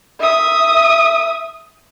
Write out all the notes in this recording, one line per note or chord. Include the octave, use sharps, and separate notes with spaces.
E5 D#6